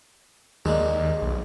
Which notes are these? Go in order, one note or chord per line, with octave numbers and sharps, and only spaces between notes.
D#2 G#3 A#3 D4
B1